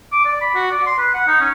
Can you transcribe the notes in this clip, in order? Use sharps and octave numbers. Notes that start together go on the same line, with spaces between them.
D6
D5
B5
F#4
D5
C6
B4
F#5
D#4
C#4